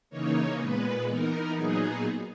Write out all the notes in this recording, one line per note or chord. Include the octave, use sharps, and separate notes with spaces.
C#3 E3 A#3 D#4 C#5
A#2 G#3 B3 B4
E3 B3 D#4 A#4
A#2 F#3 B3 D#4 G#4